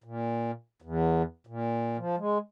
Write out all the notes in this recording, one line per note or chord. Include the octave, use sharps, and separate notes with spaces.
A#2
E2
A#2
F3
G#3